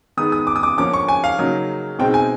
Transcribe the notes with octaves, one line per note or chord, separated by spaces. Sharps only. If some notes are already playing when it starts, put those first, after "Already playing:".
D#3 G#3 B3 D#4 D#6
D#6
D6
D#6
D6
D3 F3 A#3 C#4 D6
C#6
G#5
F5
C#3 F#3 A#3 D#4
B2 G#3 C4 D#4 G5
G#5